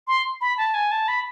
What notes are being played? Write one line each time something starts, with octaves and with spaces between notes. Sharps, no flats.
C6
B5
A5
G#5
A5
B5